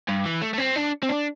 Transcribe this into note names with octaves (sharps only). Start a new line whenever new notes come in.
G2
E3
A3
A3
C4
D4
C4
D4